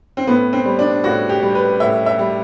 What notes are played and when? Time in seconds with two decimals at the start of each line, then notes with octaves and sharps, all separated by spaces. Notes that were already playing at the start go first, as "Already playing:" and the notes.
0.17 C4
0.27 A2 B3
0.53 C4
0.65 G3
0.79 D4
1.04 A2 F#4
1.29 G4
1.42 G3
1.55 B4
1.80 A2 E5
2.06 E5
2.19 G3